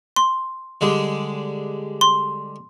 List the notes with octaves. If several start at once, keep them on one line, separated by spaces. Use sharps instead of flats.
C6
D3 G3 G#3
C6